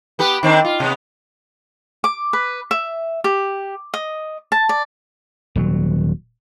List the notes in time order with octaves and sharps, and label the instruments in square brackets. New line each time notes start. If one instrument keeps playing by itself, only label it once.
[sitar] B3 G4 B4
D#3 C4 D4
F4
C3 B3
[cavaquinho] D6
B4
E5
G4
D#5
A5
D5
[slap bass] D#1 F#3